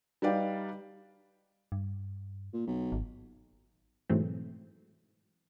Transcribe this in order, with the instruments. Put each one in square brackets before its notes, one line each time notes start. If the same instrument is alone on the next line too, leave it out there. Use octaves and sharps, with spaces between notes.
[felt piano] G3 D#4 B4 D5 F5 G5
[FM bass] G2
[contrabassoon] A#2
B1
[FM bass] G#1
[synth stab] G#2 B2 E3 F#3 A3 C4